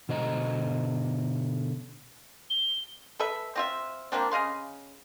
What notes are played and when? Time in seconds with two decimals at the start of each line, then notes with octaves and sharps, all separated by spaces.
0.09 B2 D3 C5 D#5 A5 A#5
2.50 G7
3.19 A4 B4 E5
3.56 C4 F4 E5
4.12 F3 A#3 C4 D4
4.31 C#3 D#5 F5 C6